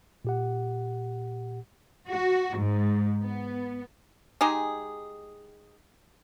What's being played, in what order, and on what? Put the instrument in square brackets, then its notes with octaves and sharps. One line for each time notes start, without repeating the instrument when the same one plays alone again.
[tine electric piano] A#2 G4 F#5
[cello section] F#4
G#2
B3
[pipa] G#3 D#4 G4 G#4